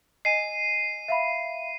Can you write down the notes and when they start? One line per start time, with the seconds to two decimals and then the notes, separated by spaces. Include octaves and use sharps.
0.25 D#5 G#5 C7 D#7
1.08 E5 F5 B5